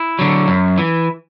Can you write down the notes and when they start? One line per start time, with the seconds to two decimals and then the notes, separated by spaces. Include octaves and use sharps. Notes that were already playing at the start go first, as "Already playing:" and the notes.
Already playing: E4
0.19 D3 F#3
0.48 F#2
0.78 E3